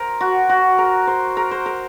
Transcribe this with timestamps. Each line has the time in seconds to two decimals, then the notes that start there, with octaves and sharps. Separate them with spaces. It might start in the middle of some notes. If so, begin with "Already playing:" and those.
Already playing: A#4 C5
0.21 F#4
0.49 F#4
0.78 A#4
1.07 C5
1.37 A#4
1.51 C5
1.66 A#4